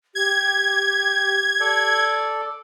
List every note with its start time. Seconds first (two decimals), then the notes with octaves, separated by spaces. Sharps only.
0.15 G4 G#6
1.60 A4 D5